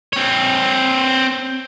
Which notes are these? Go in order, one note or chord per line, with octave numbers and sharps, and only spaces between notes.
C4 C#5